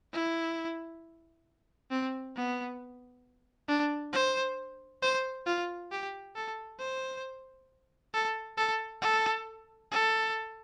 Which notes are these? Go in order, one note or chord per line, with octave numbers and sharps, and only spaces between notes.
E4
C4
B3
D4
C5
C5
F4
G4
A4
C5
A4
A4
A4
A4